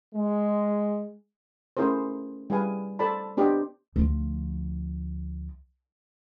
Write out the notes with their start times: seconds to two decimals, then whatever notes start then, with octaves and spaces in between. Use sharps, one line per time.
0.15 G#3
1.77 A3 C#4 E4 G#4 A#4 C5
2.50 G3 E4 G#4 B4 F5 G#5
2.99 A4 C5 D5 A5 B5
3.37 B3 D4 G4 C5 D5 D#5
3.96 D2 F3